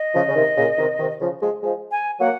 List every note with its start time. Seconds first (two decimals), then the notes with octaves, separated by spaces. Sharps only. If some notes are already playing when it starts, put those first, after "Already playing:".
Already playing: D#5
0.14 C#3 F3
0.28 C#3
0.36 C3 D#3
0.57 A#2 C#3
0.78 C3 D#3
0.99 C3 D#3
1.21 C#3 F3
1.41 F3 G#3
1.63 F3 G#3
1.91 G#5
2.19 F#3 A#3 F#5